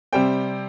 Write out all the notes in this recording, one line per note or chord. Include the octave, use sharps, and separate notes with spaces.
C3 G3 C4 G5